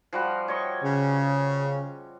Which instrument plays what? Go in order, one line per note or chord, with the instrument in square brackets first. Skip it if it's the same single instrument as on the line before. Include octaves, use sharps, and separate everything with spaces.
[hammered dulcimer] F3 G3 F#4
C#5 D#5 C#6
[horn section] C#3